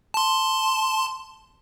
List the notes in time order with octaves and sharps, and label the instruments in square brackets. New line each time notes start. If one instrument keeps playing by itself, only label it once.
[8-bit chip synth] A5 C6